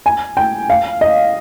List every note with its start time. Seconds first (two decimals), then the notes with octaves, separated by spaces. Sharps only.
0.06 G#5
0.37 G5
0.70 F5
1.01 D#5